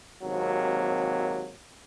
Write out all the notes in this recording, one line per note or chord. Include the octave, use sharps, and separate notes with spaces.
G#1 D#2 C3 F#3 A#3